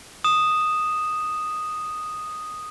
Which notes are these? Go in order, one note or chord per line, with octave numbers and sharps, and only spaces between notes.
D#6 E7